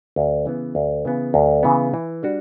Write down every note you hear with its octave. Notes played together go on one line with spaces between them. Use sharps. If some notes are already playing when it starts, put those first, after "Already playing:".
D2
C#3 E3 B3
D2
C#3 E3 B3
D2
C#3 E3 B3
E3
G3 D4 F#4